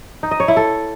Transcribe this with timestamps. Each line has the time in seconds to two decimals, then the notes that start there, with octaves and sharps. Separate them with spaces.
0.23 D#4
0.31 D#5
0.40 C#5
0.48 E4
0.57 A4